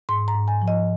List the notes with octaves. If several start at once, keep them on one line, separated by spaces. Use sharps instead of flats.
G#2 C6
A#5
G#2
G#5
F3
D#5